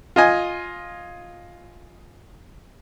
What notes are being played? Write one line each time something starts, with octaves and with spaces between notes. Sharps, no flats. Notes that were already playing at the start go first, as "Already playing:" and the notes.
F4 D#5 G#5